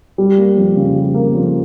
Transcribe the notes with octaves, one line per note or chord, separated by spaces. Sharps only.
G3
A#3
F2
C#3
G3
A#3
F2